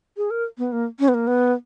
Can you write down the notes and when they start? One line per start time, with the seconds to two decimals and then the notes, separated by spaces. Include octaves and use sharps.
0.17 G#4
0.31 A#4
0.58 B3
0.72 A#3
1.00 C#4
1.08 B3
1.14 A#3
1.27 B3